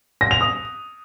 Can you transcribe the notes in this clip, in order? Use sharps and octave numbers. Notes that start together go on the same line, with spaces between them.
A#6
F7
D#6